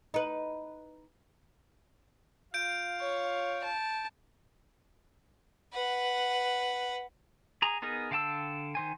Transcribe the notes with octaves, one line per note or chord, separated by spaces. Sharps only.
D#4 B4
F4 F5 G6 D7
C#5
A5
B4 F#5
G#4 A#5
B3 D#4 G#4 A#4
D3 F5 G5 A5 E6
D#3 C5 G#5